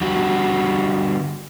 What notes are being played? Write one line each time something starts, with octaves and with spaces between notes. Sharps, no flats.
D3 G3 F#4